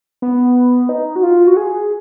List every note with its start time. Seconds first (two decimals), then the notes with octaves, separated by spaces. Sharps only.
0.22 B3
0.89 D#4
1.16 F#4
1.23 F4
1.47 F#4
1.57 G#4